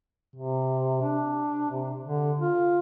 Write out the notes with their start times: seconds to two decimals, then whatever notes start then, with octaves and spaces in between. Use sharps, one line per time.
0.36 C3
1.02 D4
1.70 C3
2.04 D3
2.41 F4